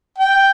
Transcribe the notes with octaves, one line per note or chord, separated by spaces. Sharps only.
G5